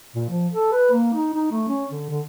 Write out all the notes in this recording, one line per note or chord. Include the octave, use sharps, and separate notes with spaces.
A#2
F3
A4
B4
A#3
D#4
D#4
A3
C#4
D3
D3